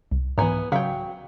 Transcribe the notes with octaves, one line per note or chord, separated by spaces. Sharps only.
C2
G#2 E3 B3 G#5 A#5
C#3 F#3 F5 G5 B6